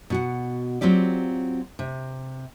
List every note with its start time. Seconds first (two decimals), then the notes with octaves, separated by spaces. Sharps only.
0.10 B2 F#4 F#5
0.81 F#3 C4 F4 G4 D5
1.79 C3